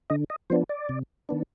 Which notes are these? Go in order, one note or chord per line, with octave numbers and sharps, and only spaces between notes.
D3 D#5
D#5
F3 B3 D4 C5
D5
C3
D#3 B3 D4